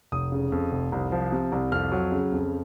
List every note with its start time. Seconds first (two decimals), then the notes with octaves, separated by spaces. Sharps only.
0.12 F1 D#6
0.32 C#3
0.52 F2
0.72 F1
0.92 C2
1.12 F3
1.32 C3
1.52 C2
1.72 F2 F6
1.92 F#3
2.12 C#3
2.32 F2